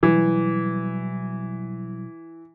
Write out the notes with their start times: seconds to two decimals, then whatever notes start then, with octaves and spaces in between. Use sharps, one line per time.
0.03 B2 E3 F#3 G3